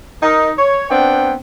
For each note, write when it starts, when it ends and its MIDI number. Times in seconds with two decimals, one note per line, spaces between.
0.23 0.49 63
0.23 0.49 70
0.58 0.87 73
0.91 1.35 59
0.91 1.35 60
0.91 1.35 62
0.91 1.35 79